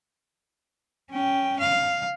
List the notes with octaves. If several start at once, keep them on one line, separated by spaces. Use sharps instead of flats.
C#4 G5
F5